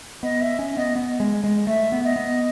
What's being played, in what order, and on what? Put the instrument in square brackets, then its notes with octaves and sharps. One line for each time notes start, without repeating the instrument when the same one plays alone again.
[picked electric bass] B3 [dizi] D#5
[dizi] E5
[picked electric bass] C#4
[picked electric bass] B3 [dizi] D#5
[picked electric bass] B3
G#3
G#3
[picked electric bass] A3 [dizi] E5
[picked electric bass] B3
[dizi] D#5
[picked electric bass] B3